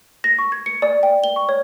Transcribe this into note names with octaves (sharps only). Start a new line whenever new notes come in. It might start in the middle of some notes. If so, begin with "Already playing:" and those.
A#6
C#6
G#6
C#7
D5
G5
G7
C#6
C#5